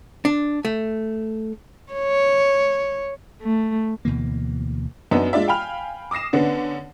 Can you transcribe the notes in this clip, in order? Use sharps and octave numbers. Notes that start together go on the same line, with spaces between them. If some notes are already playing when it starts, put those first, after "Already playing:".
D4
A3
C#5
A3
D2 B2 E3 A#3
F#2 B3 D4 D#4
G#3 D4 F4 D5 E5
F5 G5 G#5 B5 F6 F7
D6 D#6 A#6 C7 E7
D3 B3 C#4 D4